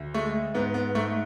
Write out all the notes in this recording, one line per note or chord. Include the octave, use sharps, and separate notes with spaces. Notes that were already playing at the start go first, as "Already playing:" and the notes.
Already playing: D2
G#3 A3
G#2 B3
B3
G#2 A3